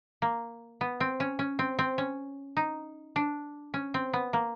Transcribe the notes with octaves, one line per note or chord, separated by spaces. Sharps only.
A#3
B3
C4
C#4
C#4
C4
C4
C#4
D#4
D4
C#4
C4
B3
A#3